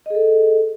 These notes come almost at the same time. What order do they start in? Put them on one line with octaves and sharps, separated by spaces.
D#5 G#4 A4